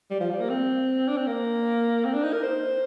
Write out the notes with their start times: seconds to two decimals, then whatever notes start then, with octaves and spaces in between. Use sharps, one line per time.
0.10 G3
0.20 F3
0.31 G3
0.40 A#3
0.50 C4
1.08 D4
1.17 C4
1.27 A#3
2.05 C4
2.14 D4
2.24 D#4
2.33 A#4
2.43 C5